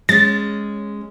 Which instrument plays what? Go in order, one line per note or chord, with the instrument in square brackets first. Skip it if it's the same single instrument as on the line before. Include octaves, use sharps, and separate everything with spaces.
[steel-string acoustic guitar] G#3 C#4 [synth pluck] A6